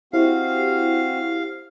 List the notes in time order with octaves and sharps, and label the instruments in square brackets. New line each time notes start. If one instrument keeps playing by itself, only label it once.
[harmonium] C4 F#4 [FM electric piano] E4 G4 C5 [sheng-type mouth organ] F5